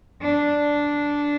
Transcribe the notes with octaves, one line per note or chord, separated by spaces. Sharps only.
D4